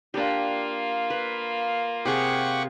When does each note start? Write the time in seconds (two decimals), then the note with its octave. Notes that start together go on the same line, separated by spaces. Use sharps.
0.14 A#3 D4 F4 G4
1.10 B4
2.05 C3 G4 G#4 F5 F#5 C#6